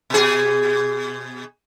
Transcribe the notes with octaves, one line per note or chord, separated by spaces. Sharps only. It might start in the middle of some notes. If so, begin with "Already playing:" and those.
B2 G#4